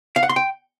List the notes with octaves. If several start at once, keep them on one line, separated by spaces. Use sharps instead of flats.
F5
F#5
C6
G5